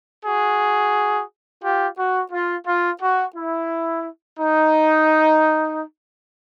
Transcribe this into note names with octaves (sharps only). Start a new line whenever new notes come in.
F#4 G#4
F4 G4
F#4
F4
F4
F#4
E4
D#4